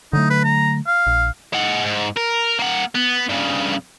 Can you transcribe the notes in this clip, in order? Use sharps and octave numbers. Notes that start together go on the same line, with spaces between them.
D3 F#3 A3 D#4
B4
A#5
F5
A#1
G#3 F#5
G#2
A#4
A#3 F#5
B3
G2 C#3